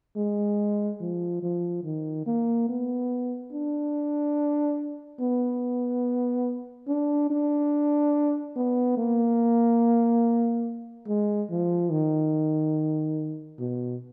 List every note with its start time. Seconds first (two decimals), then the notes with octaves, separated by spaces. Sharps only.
0.16 G#3
1.00 F3
1.42 F3
1.84 D#3
2.26 A#3
2.68 B3
3.52 D4
5.20 B3
6.88 D4
7.30 D4
8.56 B3
8.97 A#3
11.07 G#3
11.50 F3
11.91 D#3
13.59 B2